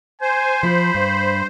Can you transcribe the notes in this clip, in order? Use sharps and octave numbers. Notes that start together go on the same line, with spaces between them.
C5 G#5
F3 B5
G2